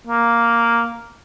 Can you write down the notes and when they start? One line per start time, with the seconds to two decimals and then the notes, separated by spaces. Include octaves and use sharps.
0.07 A#3